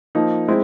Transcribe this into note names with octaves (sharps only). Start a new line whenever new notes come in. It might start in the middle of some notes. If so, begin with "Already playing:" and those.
F3 A#3 D#4
G#3 C4 E4